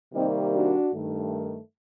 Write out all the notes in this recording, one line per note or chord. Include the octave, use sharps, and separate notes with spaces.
C3 D#3 G3 A#3 C4 D#4
D4 F#4
G2 D#3 A3